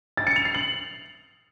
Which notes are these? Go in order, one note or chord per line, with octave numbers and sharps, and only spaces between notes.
A6
C#7
F7
C7
F#7